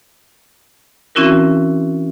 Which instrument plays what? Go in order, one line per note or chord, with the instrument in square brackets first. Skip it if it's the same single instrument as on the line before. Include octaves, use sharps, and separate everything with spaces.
[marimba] E3 C4 C#4 E4 F#4 A#4